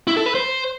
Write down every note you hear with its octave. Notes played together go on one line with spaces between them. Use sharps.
E4
A4
B4
C5